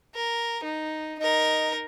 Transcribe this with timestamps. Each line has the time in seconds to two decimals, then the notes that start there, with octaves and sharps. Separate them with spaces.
0.15 A#4
0.64 D#4
1.19 D#4 A#4 D#5